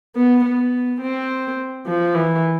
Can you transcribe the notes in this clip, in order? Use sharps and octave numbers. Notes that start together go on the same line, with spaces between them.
B3
B3
C4
F3
E3